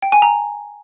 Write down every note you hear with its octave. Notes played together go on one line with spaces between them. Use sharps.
G5
G#5
A#5